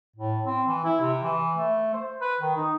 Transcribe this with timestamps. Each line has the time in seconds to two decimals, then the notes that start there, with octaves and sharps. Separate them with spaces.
0.16 A2
0.46 C4
0.67 E3
0.85 E4
1.01 C3
1.24 E3
1.57 A3
1.94 C5
2.21 B4
2.40 D#3
2.57 D#4